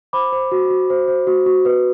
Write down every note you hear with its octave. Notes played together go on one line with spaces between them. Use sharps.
C5 B5 D6
C5
F#4
F#4
C5
C5
F#4
F#4
B4